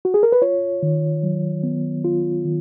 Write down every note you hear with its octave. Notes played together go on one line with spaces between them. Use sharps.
F#4
G#4
A#4
B4
F4 C#5
D#3
F#3
B3
F4
D#3